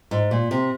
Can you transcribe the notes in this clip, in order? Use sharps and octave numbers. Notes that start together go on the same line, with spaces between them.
G#2
A#2
C3